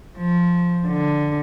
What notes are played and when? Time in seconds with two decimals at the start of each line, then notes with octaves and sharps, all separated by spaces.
0.17 F3
0.87 D3